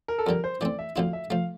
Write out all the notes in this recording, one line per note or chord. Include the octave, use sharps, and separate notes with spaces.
A#4
A4
F2 D3 G3 A#4
C5
E3 A3 C4 D5
E5
D2 D3 F3 C4 E4 F5
E5
F3 A3 F5